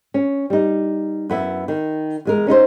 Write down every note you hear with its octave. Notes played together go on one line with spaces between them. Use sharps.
C#4
G3 D#4
F#2 B3 E4
D#3
E2 G#3 A#4
C#4 D#4 A#4 C5